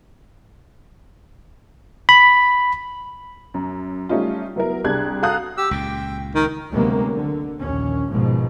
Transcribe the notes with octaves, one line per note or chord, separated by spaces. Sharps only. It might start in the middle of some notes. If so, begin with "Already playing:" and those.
B5
F#2
G3 A3 C#4 D#4 F4
F#3 B3 E4 A#4
C2 D4 G4 G#4 F#6 G#6
F#4 A4 F5 A#5 D#6 F#6
G4 E6
C#2 A#2 G5
D#3 A#4
D2 C3 F#3 G#3 A#3 B3
D3
A#1 D#2 C#4
G#1 G#2 B2 F3